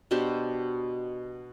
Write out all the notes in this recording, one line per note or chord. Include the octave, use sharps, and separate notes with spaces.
B2 D4 G4 C5